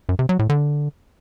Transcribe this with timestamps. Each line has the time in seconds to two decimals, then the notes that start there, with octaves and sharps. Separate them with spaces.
0.09 F#2
0.19 C3
0.29 F#3
0.39 A2
0.49 D3